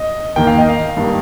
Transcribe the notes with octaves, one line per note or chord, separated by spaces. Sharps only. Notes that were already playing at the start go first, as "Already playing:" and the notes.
Already playing: D#5
D#2 D#3 A#3 G5
F5
D#5
F5
G2 D#3 A#3